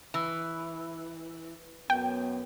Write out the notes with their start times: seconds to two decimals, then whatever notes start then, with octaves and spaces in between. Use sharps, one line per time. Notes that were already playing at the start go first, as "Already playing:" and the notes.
0.14 E3
1.90 F#2 B3 G5